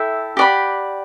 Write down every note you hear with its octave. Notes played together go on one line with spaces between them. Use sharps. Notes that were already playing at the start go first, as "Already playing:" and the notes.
Already playing: E4 A4 E5 G5
G4 D5 F#5 B5